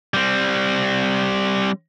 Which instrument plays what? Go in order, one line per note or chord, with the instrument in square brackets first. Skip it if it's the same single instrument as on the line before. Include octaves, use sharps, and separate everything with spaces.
[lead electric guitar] G3 C4